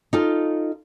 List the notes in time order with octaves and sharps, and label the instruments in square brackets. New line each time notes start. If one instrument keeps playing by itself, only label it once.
[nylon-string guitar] D#4 F4 A4